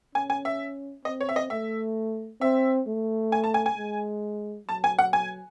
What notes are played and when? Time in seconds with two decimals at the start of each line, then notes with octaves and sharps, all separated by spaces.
0.15 C#4 G#5
0.30 G#5
0.45 E5
1.05 C4 D#5
1.21 C#5
1.29 E5
1.36 D#5
1.50 A3 E5
2.41 C4 E5
2.87 A3
3.32 G#5
3.44 A5
3.54 G#5
3.66 G#5
3.77 G#3
4.68 F#3 A5
4.84 G#5
4.99 F#5
5.13 G#5